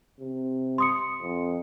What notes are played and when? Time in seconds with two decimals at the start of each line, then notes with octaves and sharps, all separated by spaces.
0.20 C3
0.78 C6 D#6 C#7
1.22 F2